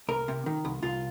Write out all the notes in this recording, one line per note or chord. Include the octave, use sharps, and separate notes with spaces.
C2 A#4
C3
D#3
C2
C2 F4